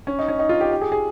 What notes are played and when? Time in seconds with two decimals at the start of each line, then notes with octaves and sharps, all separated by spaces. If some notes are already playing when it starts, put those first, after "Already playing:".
0.07 C#4
0.19 D#4
0.28 C#4
0.39 D#4
0.49 F4
0.61 G4
0.71 G4
0.81 G#4
0.92 G#4